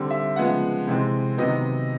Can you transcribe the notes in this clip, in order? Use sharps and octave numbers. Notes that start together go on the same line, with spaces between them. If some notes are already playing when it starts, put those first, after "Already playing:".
Already playing: D3 G3 C4
E5
C#3 F3 G#3 B3 F#5
C3 E3 G#3 C4
C3 D#3 F#3 B3 D#5